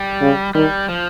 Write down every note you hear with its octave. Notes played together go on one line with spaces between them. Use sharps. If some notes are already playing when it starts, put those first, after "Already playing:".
Already playing: G3
C#3
D#3 G3
F3